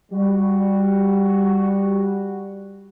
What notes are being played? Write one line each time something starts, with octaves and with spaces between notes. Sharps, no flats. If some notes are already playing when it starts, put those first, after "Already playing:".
G3 F#4